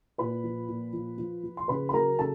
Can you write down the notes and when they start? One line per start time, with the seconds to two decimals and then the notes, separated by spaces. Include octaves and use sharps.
0.18 A#2 B4 B5
0.44 F3
0.68 A#2
0.93 F3
1.18 F3
1.44 F3
1.57 C6
1.68 C#3 B4 B5
1.89 B5
1.93 F#3 A#4 A#5
2.19 C#3 A4 A5